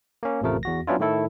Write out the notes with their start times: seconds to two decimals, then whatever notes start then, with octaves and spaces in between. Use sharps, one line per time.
0.23 A#3 C#4
0.41 A1 F2 C3 F3 A3 A#4
0.63 E2 F#4 A#6
0.87 F#3 B3 C#4 D4 E4 F4
0.99 A2 D#3 A3 E4 A4